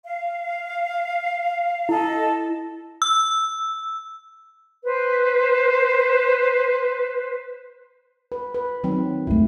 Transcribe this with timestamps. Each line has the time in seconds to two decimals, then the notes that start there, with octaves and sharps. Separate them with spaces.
0.04 F5
1.89 E4 A4 D#5
3.02 E6
4.84 B4 C5
8.32 B4
8.54 B4
8.84 D#3 F#3 C4
9.27 F2 A3 E4